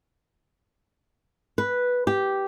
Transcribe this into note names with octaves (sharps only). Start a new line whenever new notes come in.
B4
G4